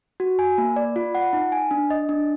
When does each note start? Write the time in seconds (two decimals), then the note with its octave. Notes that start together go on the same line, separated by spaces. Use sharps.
0.20 F#4
0.39 G#5
0.58 A#3
0.76 D5
0.96 F4
1.15 F#5
1.33 D#4
1.52 G#5
1.71 D4
1.90 D#5
2.09 D4